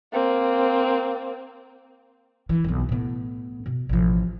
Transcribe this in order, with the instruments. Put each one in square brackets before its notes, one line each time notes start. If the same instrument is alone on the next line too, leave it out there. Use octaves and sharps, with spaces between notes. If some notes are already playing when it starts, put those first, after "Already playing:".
[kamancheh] A#3 C4
[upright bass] E3
E1 B1
A2 B3
B2
A1 F3